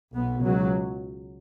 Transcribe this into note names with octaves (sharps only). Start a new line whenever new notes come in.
B1 B2 B3
C#2 F#3